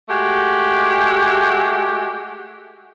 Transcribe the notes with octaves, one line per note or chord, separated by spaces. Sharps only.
G#3 A3 F#4 G4